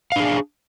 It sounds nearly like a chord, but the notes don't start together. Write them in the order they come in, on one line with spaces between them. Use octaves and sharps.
F5 D4 G#4